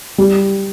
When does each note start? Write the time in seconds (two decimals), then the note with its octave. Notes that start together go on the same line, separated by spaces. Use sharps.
0.18 G3